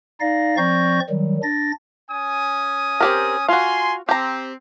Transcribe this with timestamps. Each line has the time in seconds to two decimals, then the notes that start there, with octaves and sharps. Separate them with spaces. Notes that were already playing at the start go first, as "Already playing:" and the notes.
0.21 D#4 D5 F5 A#6
0.57 F3 C4 D5 C#6 G6 A#6
1.10 D#3 F#3 G3
1.43 D4 A6 A#6
2.11 C#4 G#5 D#6
3.01 C4 G4 A#4
3.48 F4 F#4 G#5 C6
4.09 C4 G4 A#5